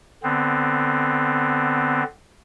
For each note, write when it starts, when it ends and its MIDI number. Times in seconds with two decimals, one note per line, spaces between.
0.23 2.03 50
0.23 2.03 59
0.23 2.03 60